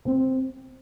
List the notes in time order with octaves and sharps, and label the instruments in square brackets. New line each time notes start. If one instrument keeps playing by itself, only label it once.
[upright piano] C4